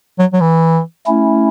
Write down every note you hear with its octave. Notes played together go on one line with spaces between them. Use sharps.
F#3
F#3
E3
A3 C#4 E4